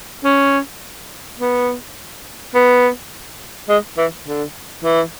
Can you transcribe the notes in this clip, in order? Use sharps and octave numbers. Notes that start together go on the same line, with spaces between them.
C#4
B3
B3
G#3
E3
D3
E3